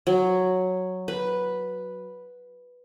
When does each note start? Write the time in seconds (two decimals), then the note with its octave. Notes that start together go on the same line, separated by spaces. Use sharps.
0.07 F#3
1.08 B4